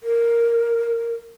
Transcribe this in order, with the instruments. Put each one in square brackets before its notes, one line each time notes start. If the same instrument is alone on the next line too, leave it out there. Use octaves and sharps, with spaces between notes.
[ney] A#4